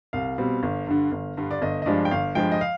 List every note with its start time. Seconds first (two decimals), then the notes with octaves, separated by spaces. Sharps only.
0.13 C2 F5
0.38 B2 G3 C4
0.63 G1
0.87 G2 D3
1.12 G1
1.37 G2 D3
1.51 D5
1.62 G1 D#5
1.82 D#5
1.86 G2 F3 G#3 D5
2.05 G5
2.11 G1 F5
2.35 G2 F3 G#3 G5
2.52 D#5
2.61 F5